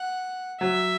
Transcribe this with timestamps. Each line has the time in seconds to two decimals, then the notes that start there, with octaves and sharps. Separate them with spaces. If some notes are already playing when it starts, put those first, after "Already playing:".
Already playing: F#5
0.61 F#3 E5